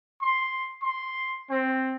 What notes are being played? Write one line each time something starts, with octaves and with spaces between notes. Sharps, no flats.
C6
C6
C4